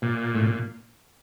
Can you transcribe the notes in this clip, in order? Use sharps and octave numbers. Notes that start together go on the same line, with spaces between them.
A#2
A2
A#2